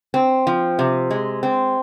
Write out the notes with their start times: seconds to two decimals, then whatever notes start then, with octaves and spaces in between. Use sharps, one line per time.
0.14 C4
0.47 F3
0.79 C3
1.11 G#3
1.43 C4